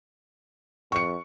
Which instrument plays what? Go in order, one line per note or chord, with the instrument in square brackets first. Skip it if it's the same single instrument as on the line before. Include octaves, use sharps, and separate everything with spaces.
[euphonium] F2 [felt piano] C#6 C#7